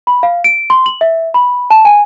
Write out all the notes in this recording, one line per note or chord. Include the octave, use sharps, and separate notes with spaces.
B5
F5
D7
C6
F#7
E5
B5
A5
G#5